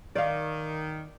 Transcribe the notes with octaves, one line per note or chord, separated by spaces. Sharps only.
D#3 D5 F5